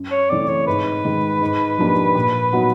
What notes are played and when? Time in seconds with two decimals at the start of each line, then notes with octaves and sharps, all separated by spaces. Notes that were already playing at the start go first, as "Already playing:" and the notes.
Already playing: F#2
0.11 C#5
0.30 C#3 E3 A3 C4 D5
0.49 C#5
0.67 G#2 B4
1.04 D#3 G#3
1.41 G#2
1.78 F3 A#3 D4 G4
2.15 A#2
2.53 F#3 B3 D#4 F#4